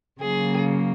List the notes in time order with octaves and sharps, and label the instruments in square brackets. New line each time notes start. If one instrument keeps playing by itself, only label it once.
[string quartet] C#3 F#3 A#3 G#4